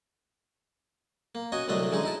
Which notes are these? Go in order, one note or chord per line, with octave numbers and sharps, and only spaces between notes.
A#3
C#4 F#4 D#5 G#5
C2 D3 F#3 A3 D4 D#5
D3 E3 G#3 C#4 D#4
D#4 E4 A5